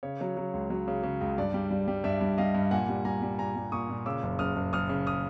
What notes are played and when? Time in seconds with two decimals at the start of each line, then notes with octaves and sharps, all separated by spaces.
0.03 C#3 C#5
0.21 F#3
0.37 F#3
0.54 C#2
0.70 F#3
0.88 C#3
1.03 C#3
1.21 C#2
1.38 G2 D5
1.54 G3
1.70 G3
1.88 G3
2.04 G2 D5 E5
2.21 G2
2.38 G3 D#5 F5
2.55 G2
2.71 A#2 F#5 G#5
2.88 G3
3.05 G3 G#5 A#5
3.22 G3
3.39 A#2 G#5 A#5
3.56 G3
3.72 A#2 C#6 D#6
3.90 A#2
4.06 C#3 D6 E6
4.23 F#1
4.39 F#1 D#6 F6
4.56 F#1
4.73 F#1 D#6 F6
4.89 C#3
5.06 D#6 F6